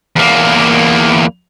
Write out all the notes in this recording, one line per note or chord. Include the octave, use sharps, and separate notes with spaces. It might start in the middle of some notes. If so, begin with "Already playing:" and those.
E2 A#3